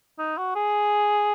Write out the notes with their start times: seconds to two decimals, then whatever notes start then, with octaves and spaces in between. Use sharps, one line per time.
0.19 D#4
0.38 F#4
0.55 G#4